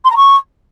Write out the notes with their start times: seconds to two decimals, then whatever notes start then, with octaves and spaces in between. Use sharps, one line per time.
0.04 C6
0.10 A#5
0.16 C#6